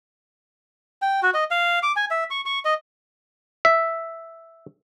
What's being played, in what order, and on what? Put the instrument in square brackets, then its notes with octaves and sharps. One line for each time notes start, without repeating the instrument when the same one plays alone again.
[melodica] G5
F#4
D#5
F5
D6
G#5
E5
C#6
C#6
D#5
[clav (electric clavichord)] E5